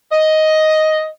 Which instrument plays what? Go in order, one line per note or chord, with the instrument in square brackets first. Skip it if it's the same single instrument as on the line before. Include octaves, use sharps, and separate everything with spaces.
[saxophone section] D#5